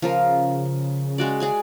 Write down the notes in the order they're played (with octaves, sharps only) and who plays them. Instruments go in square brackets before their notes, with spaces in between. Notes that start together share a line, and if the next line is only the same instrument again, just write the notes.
[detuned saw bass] C#3 [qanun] F3 F4 A#4
[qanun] G#3 F#4 D5
G#4 D5 G#5